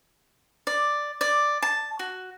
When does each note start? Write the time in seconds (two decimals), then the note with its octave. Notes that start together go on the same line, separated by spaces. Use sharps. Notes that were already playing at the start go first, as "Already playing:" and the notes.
0.67 D5
1.21 D5
1.62 A5
1.99 F#4